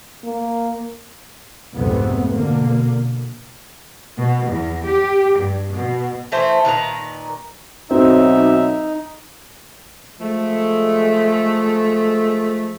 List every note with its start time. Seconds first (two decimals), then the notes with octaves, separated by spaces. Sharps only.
0.24 A#3
1.76 C2 F2 G#2 C3 A3 B3
2.32 B2 D3 A#3
4.18 B2
4.47 E2
4.86 G4
5.40 G2
5.75 B2
6.32 E3 A3 C5
6.65 A#2 D#3 B4 A#5
7.91 B1 C4 D#4 E5
10.20 F3 G#3 A3